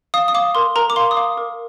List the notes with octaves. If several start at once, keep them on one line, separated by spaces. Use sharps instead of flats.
F5 D#6
D#6
F5 D6
A#4 C6
A#4 A#5
D6
F5 C6
D#6
F5 D6
A#4